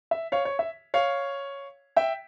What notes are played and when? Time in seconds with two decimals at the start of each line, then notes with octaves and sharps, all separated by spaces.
0.11 E5
0.32 C#5 F5
0.45 C#5
0.59 E5
0.94 C#5 F5
1.96 E5 G5